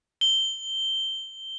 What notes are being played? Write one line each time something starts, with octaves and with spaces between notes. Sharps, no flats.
G7